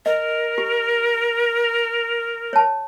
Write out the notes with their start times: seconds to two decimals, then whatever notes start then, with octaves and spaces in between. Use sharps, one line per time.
0.06 A#4 D#5
0.58 G4
2.53 C#5 A5